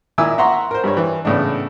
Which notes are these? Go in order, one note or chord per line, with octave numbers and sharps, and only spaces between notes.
A#2 D#3 E4 G#5 D6 E6
E5 F#5 A#5 C6 C#6
A#4 C5
G2 G3 D4 C#5
E3
A2 C#3 B3 D4